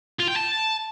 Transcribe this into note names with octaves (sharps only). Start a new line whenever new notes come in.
F4
G5
A5